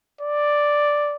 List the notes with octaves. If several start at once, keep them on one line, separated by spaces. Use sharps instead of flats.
D5